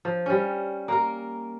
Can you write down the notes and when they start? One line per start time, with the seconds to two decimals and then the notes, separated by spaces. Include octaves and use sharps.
0.05 F3
0.26 G3 C#4
0.88 A#3 A#4